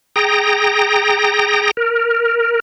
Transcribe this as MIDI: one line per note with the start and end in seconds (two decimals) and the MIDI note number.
0.16 1.71 68
0.16 1.71 79
0.16 1.71 82
0.16 1.71 94
1.77 2.60 70